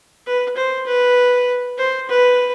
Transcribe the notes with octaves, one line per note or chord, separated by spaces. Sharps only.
B4
C5
B4
C5
B4